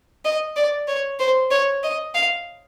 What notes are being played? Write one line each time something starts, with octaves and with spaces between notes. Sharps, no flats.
D#5
D5
C#5
C5
C#5
D#5
F5